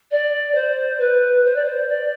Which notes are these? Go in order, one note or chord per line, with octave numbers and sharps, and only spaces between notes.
D5
C5
B4
C5
D5
C5
D5